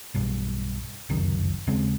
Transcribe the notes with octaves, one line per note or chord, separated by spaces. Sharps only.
B1 G2
F1 C#2 F#2 D#3
D#2 C#3 G#3 C4